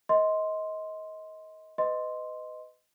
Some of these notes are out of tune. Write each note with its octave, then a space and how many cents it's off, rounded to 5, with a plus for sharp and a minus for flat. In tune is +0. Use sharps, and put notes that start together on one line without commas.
A#4 +0 D#5 +25 C6 +0
B4 +30 D#5 +0 C6 +0